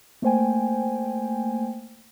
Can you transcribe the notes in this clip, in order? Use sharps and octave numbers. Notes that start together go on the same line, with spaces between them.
A3 A#3 C5 G5 G#5